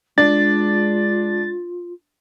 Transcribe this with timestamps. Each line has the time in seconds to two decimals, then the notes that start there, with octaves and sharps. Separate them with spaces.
0.18 G#3 D4 F4 A6